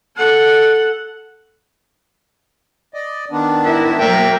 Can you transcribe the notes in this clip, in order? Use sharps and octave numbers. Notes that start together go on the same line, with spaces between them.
A4 F#5
D5 D#5
D#3 B3 D4
E4 A#4 E5
F#3 A#3 A#4 E5 G5